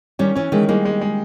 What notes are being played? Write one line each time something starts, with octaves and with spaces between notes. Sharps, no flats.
D#3 G3 C#4
E3 C#4
D#3 E3 G#3
G3 G#3 A#3
G#3
G#3